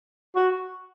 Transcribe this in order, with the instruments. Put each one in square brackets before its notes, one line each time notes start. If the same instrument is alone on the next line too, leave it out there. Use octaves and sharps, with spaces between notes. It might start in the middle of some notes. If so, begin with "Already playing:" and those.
[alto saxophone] F#4